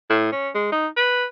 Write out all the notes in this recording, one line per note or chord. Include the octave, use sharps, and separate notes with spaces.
A2
C#4
G#3
D#4
B4